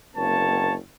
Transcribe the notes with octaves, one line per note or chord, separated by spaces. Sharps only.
F#1 D2 A#3 C4 C#5 A5